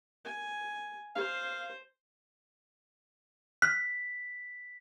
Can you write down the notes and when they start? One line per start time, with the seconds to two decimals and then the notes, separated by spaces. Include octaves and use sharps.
0.25 G#5
1.16 C5 F5
3.62 F6 F#6 B6